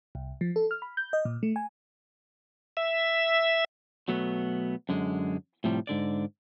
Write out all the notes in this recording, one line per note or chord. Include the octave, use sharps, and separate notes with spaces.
C2
F3
A4
F6
B5
G6
D#5
A#2
A3
G#5
E5
B2 F#3 A3 B3
F#2 D3 G#3
A2 C3 F3 G3
G#2 D3 D5